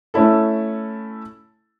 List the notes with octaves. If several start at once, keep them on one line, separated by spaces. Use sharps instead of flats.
A3 C#4 E4 A4